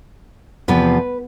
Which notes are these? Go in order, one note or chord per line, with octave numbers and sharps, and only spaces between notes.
E2 C3 F3 B3 B4